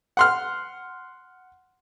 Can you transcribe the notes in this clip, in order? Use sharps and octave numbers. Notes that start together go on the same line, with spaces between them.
F#5 C6 F6